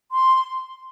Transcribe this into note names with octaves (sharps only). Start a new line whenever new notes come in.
C6